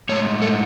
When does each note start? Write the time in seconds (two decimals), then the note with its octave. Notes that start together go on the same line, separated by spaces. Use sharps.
0.09 A2 G#3 C#5
0.42 A2 G#3 A4